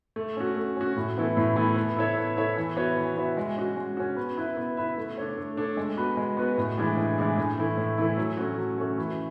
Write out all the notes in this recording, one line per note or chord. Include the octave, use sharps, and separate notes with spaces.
A3
C#4 F#4
A3
C#4 F#4
A2
E3 B3 E4 A4
A2
E3 B3 E4 A4
B3
E4 A4 C#5 E5
B3
E4 A4 C#5 E5
E3
B3 F#4 C#5 E5
E3
B3 F#4 C#5 E5
G#3
C#4 F#4
G#3
C#4 F#4
B3
E4 B4 E5
B3
E4 B4 E5
A3
D4 A4 C#5
A3
D4 A4 C#5
G#3
B3 F#4 B4
G#3
B3 F#4 B4
A2
E3 G#3 D4 G#4
A2
E3 G#3 D4 G#4
A2
E3 A3 E4
A2
E3 A3 E4
F#3
A3 C#4 F#4
F#3
A3 C#4 F#4
E3